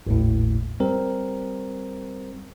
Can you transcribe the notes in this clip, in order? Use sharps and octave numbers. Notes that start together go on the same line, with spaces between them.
G#1 D#2 A2
G3 C4 A#4